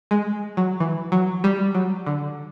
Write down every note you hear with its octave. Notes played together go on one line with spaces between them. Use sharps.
G#3
F#3
E3
F#3
G3
F#3
D3